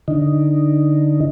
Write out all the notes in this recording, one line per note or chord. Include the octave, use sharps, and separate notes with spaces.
D3 D#4